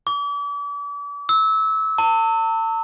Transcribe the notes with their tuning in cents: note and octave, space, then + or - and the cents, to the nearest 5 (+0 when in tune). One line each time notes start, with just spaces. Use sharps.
D6 -40
E6 -25
A5 +40